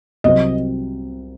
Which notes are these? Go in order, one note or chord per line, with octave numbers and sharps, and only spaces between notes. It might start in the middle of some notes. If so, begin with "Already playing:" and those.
C2 C3 F#3 C4 D#5